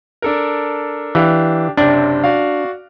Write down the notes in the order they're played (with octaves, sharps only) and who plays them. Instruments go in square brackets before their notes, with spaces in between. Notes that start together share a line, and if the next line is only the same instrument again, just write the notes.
[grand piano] D4 A4 A#4
[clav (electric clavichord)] E3 [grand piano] D4 G4 F5
[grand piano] F#1 C3 C4 [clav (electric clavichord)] D4
[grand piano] F#4 D5 F5